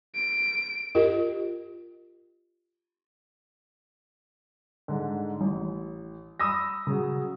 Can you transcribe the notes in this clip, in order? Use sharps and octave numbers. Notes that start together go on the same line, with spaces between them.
D7
F4 G4 A#4 D#5
G#2 D3
A1
B5 D#6 E6 A#6
C#3 F#3